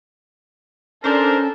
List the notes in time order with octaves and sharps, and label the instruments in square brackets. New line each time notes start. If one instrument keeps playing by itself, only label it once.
[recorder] C#4 [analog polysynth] D4 C5 [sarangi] A4 [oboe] A#4